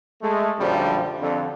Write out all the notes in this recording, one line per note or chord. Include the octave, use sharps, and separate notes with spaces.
G#3 A3
A#1 F#2 D3 F3 G3
F2 D3